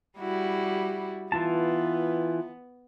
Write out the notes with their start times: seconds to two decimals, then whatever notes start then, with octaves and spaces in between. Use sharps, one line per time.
0.18 G3 E4 F#4
1.32 E3 B3 F4 A5